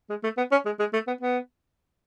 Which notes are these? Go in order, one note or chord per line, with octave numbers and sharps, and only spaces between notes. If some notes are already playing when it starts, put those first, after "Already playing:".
G#3
A3
B3
C#4
G#3
G#3
A3
B3
B3